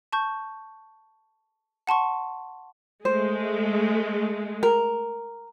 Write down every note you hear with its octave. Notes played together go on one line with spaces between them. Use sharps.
A5 C#6 G6
F#5 A5 C6 C#6
G#3 A3 C5
A#4